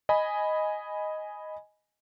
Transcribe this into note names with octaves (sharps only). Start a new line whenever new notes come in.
D#5 G#5 B5